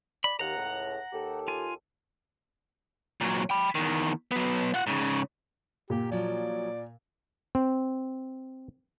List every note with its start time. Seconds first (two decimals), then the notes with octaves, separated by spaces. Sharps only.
0.24 D5 B5
0.39 D#2 F#5 A#5
0.56 C#2 A2
1.13 D#2 G4 A4
1.48 F4 G#5
3.21 A#2 F#3
3.50 G5 B5
3.75 E2 D#3
4.31 F#3 B3
4.74 F4 F#5
4.87 G#2 C#3
5.90 A#2 G4
6.12 F3 F#3 D5
7.55 C4